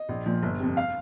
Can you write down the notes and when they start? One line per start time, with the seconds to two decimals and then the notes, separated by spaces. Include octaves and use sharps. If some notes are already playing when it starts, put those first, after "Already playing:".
Already playing: D#5
0.09 A#1
0.26 A#2 F3
0.42 G1
0.60 F2 C3
0.77 F5